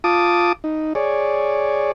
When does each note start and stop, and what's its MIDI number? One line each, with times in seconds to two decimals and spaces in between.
0.04 0.53 65
0.04 0.53 81
0.04 0.53 86
0.04 0.53 87
0.64 0.93 63
0.95 1.92 68
0.95 1.92 73
0.95 1.92 74